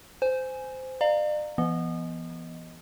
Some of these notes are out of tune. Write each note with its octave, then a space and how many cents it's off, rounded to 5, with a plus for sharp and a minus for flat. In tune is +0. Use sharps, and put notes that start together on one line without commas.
C5 -15 G#5 +0
D5 +40 F5 +0 A#5 -20
E3 +40 B3 -15 D#5 +0